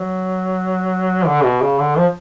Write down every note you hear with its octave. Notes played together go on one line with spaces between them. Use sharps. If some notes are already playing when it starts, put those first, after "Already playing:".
Already playing: F#3
D3
B2
C#3
D3
F3